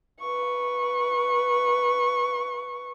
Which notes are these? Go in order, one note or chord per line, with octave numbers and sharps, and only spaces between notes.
B4 C#6